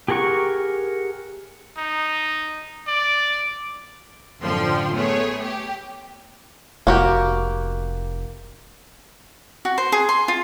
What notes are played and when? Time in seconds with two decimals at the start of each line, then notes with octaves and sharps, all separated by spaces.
0.08 G4 G#4 A#4 F#5 C#6
1.77 D#4
2.88 D5
4.40 A1 F#2 D3 F3 G5 C6
4.95 A3 B3 G#4 C#5
5.43 G4
6.87 F1 A#3 F#4 G4
9.65 F#4
9.78 C5
9.92 G#4
10.09 C6
10.28 F4